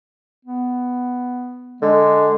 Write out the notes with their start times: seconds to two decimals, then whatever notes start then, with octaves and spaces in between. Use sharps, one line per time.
0.45 B3
1.82 D3 G#3